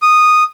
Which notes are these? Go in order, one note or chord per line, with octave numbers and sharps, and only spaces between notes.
D#6